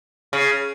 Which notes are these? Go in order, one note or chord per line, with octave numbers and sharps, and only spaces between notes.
C#3